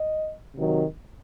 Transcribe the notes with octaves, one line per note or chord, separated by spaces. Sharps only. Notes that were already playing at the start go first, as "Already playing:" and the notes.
Already playing: D#5
C3 D#3 F#3